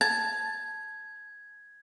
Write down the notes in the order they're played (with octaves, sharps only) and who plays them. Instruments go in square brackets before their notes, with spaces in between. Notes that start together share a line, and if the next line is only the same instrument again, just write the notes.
[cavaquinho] A5 [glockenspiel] G#6